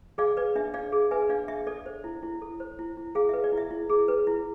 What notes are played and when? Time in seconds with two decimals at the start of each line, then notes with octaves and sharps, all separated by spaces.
0.18 G#4 D5 F5
0.37 B4 D5
0.55 D4 E5
0.74 D4 D5 F5
0.92 G#4
1.11 B4 E5 G#5
1.29 D4 D5 F5
1.48 D4 E5
1.67 A4 D5
1.86 C5
2.04 E4
2.23 E4
2.42 A4
2.60 C5
2.79 E4
2.97 E4
3.15 G#4 F5
3.29 B4 E5
3.44 D5
3.52 E4
3.57 E5
3.71 E4
3.89 G#4
4.08 B4
4.27 E4